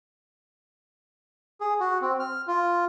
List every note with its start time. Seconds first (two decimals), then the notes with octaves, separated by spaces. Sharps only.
1.61 G#4
1.80 F#4
2.01 C4
2.20 F6
2.47 F4